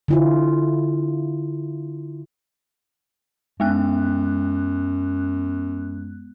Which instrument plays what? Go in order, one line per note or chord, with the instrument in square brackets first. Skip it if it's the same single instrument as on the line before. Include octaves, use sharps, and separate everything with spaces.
[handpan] D3 E4 F4
[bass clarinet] F#2 [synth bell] G#3 B3 F#6